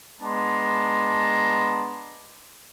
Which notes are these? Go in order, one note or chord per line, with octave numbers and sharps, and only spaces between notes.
G#3 B3 D4 A5 A#5 C6